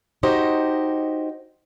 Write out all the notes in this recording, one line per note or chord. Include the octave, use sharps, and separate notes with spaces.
D#4 F#4 G4 C5 D#5